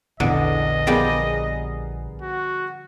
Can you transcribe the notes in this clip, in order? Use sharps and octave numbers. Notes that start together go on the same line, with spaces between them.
A#1 E2 D3 D#5
F3 G3 B3 G4 G#4 A#4
F#4